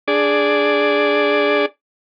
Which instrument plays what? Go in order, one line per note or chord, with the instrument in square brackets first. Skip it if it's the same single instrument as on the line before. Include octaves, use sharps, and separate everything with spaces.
[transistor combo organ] D4 G#4 D5